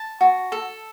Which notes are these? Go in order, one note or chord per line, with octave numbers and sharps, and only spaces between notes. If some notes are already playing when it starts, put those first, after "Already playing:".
Already playing: A5
F#4
A4